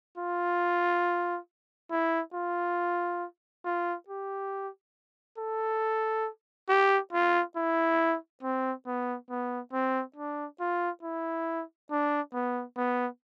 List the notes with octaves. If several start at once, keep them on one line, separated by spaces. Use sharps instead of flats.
F4
E4
F4
F4
G4
A4
G4
F4
E4
C4
B3
B3
C4
D4
F4
E4
D4
B3
B3